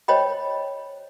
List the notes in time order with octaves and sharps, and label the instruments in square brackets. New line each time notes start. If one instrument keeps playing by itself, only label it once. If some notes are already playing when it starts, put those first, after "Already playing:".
[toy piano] C5 C#5 D#5 G5 B5